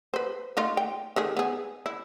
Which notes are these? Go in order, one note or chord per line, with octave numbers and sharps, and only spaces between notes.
B4 C5
A3 D#4 F4
G5
D#3 A3 G#4
B3 G#4
E4